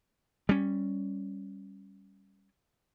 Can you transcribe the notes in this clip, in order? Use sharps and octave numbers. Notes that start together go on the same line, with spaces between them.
G3 C#4